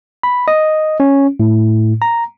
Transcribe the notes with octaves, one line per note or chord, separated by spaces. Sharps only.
B5
D#5
C#4
A2
A#5